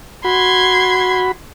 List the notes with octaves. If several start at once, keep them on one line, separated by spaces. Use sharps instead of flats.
F#4 B5 C6 G#6